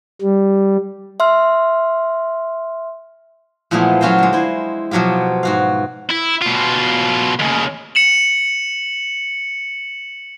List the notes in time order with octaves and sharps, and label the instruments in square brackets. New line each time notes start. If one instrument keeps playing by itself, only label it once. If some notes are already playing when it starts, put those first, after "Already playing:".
[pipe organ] G3
[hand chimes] E5 C6 F6
[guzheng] A#2 E3 F3 G#3 A3 B3
F#3 C#4 F4 F#4 C5
D3 G#3
E4 C5
B2 F3 F#3 F4 G4
G#2 F#4 F5
[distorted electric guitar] E4
B2 F4
D#2 C#3
[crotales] C#7 E7 F#7